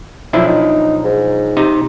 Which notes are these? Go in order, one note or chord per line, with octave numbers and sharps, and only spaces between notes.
B1 F3 D4 E4
D#4
G#2
C3 D#4